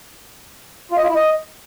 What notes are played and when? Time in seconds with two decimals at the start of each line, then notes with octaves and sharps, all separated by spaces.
0.91 F4
0.97 D#5
1.03 F4
1.09 E4
1.15 D#5